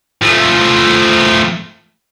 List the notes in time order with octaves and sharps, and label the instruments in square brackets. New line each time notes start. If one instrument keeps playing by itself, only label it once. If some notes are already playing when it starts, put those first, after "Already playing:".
[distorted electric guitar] F3 A3